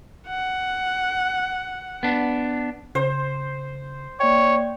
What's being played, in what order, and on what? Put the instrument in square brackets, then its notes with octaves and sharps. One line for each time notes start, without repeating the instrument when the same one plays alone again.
[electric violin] F#5
[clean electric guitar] B3 D4
[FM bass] C#3 [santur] C5
[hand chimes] A#3 D5 G5 [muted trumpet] C#5